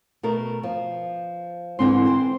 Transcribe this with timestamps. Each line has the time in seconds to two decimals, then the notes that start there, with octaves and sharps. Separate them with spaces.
0.23 B2 A3 A#4
0.63 F3
1.79 G#2 D3 E3 C4 C6
2.05 C5 G5